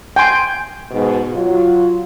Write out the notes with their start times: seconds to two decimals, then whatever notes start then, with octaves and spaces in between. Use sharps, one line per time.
0.16 G5 G#5 C6
0.91 G#2 B2
1.34 F#3 F4